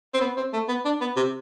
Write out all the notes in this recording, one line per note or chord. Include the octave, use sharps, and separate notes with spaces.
C4
B3
C4
A3
B3
D4
B3
C3